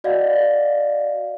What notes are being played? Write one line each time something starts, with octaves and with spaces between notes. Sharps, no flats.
F#4 D5 D#5 F5 F#5